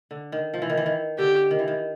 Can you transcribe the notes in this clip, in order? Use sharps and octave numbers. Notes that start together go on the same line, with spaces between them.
D3
D#3
F3
E3
D#3
E3
D#3
D3 G4
D#3
E3
D#3